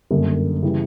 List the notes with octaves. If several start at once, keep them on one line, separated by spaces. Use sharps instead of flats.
G1 F#2 D3 G3 A#3
C#3 E3 G3